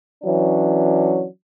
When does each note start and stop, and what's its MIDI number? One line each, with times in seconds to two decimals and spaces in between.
0.24 1.25 52
0.24 1.25 54
0.24 1.25 61
0.24 1.25 62